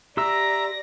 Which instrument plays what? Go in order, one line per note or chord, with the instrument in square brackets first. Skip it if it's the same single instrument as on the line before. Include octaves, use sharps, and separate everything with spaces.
[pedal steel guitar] G4 C6 E6 [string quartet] D5 A#6 [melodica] E5 A#5